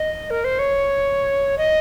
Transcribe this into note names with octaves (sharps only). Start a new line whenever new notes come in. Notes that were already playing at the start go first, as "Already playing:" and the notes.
Already playing: D#5
A#4
C5
C#5
D#5